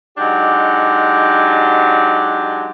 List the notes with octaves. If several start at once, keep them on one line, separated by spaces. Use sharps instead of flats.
F#3 G#3 D4 D#4 G4